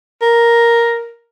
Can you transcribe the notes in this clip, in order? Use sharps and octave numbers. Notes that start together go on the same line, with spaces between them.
A#4